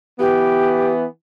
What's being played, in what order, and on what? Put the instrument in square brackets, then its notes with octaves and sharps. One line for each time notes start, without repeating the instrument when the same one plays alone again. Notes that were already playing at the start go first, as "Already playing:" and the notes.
[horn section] E3 B3 [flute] G4